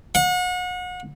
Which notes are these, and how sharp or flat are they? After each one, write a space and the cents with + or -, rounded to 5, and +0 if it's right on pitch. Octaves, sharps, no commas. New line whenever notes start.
F#5 -35